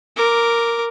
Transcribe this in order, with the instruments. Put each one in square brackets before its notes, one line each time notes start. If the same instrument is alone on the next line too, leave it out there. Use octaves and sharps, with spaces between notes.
[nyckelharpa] A#4 D6